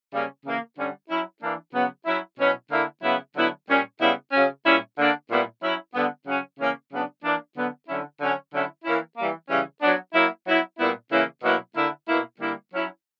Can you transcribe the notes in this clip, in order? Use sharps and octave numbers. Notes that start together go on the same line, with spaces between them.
C#3 G3 A#3 C#4
C#3 E3 A#3
D3 G3 C#4
F#3 C#4 E4
E3 A#3 D4
C#3 F#3 B3
F#3 C#4 E4
B2 F#3 C#4 E4
D3 A#3 E4
C#3 F#3 B3 E4
D3 F#3 B3 E4
A#2 G3 C#4
C#3 G3 B3 E4
C#3 F#3 C#4
A#2 G3 C#4 E4
D3 A#3 D4
A#2 G3 B3 E4
F#3 C#4 E4
D3 G3 B3
C#3 F#3 C#4
C#3 E3 A#3 C#4
C#3 F#3 B3 D4
E3 A#3 D4
D3 F#3 B3
D3 F#3 C#4 E4
D3 F#3 C#4
D3 F#3 C#4 E4
E3 A#3 C#4 E4
E3 G3 A#3
C#3 E3 G3 C#4
F#3 B3 D4
F#3 A#3 E4
F#3 B3 E4
A#2 G3 B3 E4
C#3 E3 A#3 C#4 E4
B2 F#3 A#3 E4
D3 A#3 E4
B2 A#3 E4
D3 G3 A#3 E4
F#3 C#4 E4